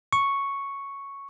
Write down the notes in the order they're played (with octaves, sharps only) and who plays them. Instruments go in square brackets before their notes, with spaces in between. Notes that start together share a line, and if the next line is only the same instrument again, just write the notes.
[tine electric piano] C#6